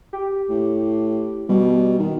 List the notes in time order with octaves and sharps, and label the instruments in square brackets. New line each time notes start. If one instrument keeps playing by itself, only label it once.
[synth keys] G4
[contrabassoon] A2
[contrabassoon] B2 [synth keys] G3
[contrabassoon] D#3